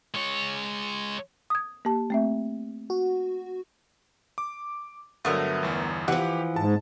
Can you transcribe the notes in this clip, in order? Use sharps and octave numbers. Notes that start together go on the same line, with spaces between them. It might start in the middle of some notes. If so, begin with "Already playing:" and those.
G#3 C#5
D#6 G#6
A#3 G4 A5
A3 C4 E5
F#4
D6
G2 D3 F#3 A3 B3 A#4
G1 E2
E3 F3 G4 F#5
G#2 A5